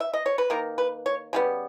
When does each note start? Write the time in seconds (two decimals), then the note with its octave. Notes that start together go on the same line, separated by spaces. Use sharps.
0.00 E5
0.14 D#5
0.26 C#5
0.38 B4
0.50 D#3 A#3 A#4
0.78 B4
1.06 C#5
1.33 C#3 G3 B3